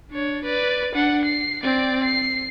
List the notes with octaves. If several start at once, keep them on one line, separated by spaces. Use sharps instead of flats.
D4 C#5
B4 D5
D4 F#5
C7
C4 D5
C7